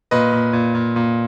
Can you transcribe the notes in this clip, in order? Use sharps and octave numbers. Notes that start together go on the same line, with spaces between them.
A#2 B4 D#5
A#2
A#2
A#2
A#2